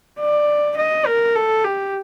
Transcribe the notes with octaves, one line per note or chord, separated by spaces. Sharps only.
D5
D#5
A#4
A4
G4